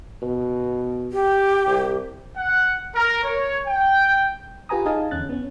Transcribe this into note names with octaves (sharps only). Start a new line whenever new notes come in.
B2
G4
C2
F#5
A#4
C#5
G5
F4 G4 B4 G#5 A#5 D#6
D#4 G#4 D#5 F5 G#5 A5
E2 D3 C#4 F#6 A6
B3 C#4